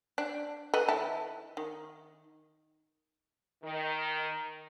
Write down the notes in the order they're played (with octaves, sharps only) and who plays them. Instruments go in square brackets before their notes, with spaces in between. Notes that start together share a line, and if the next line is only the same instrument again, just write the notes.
[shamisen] D4
A4 B4 D#5
D#3 E4 A5
D#3
[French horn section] D#3